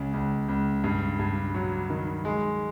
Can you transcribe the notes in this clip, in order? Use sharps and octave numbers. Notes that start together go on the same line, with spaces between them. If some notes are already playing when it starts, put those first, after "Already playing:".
Already playing: C#2 C#3
C#2
C#2
G2
G2
F#3
D#3
G#3